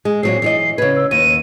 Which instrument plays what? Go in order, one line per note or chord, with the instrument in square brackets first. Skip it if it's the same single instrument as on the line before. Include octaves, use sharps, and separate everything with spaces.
[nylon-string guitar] G#3
[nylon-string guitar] A#2 F#3 C4 [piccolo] C7
[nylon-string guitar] E3 C#5 D#5
[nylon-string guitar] C#3 B4 [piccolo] G#6
[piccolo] E6
[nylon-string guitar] D#2 [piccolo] D#7